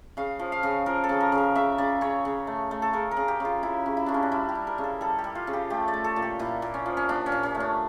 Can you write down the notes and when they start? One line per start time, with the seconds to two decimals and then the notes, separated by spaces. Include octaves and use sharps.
0.17 C#3 F5
0.39 F3
0.52 F5
0.63 C#3
0.86 F3 A#4
1.04 A4
1.09 C#3
1.20 A#4
1.32 C#3
1.38 A#4
1.55 C#3 E5
1.78 C#3 D5
2.01 C#3 C#5
2.25 C#3
2.47 A3
2.71 A3
2.82 A4
2.93 C#3 A#4
3.11 A#4
3.17 C#3
3.28 G4
3.40 C#3 F4
3.63 C#3 E4
3.86 C#3
3.97 E4
4.06 C#3 D4
4.14 C#4
4.22 D4
4.32 G3 E4
4.49 G4
4.55 G3
4.67 A#4
4.78 C#3
4.84 A4
5.01 G3 A4
5.19 G4
5.24 G3
5.35 F4
5.47 C#3
5.53 G4
5.70 A3 G4
5.88 D5
5.94 A3
6.04 A4
6.16 A#2
6.22 G4
6.39 A#2 E4
6.62 A#2
6.74 C#4
6.86 F3
6.97 C#4
7.09 A#2 D4
7.26 C#4
7.32 A#2
7.43 C#4
7.55 A3
7.60 D4